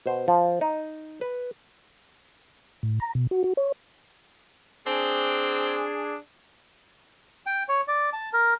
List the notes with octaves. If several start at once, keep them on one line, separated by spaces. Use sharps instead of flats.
B2 C5
F3
D#4
B4
A2
A#5
B2
F#4
F#4
C#5
C4 D4 G#4
G5
C#5
D5
A5
A#4